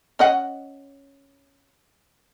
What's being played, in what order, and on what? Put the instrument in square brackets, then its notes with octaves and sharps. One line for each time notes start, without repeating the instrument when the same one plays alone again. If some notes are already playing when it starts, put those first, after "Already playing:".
[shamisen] C#4 D#5 F#5